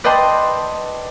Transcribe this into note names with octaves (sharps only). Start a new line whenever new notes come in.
B4 D5 D#5 G5 A5 C6